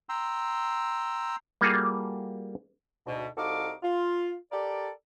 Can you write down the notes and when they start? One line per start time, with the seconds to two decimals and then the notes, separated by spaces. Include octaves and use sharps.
0.09 G5 A#5 C6 E6
1.61 G3 A#3 F4 F#4 G#4 A4
3.06 D2 G#2 B2
3.37 C2 D#4 F#4 A4 F5 D6
3.83 F4
4.52 G4 A4 A#4 D5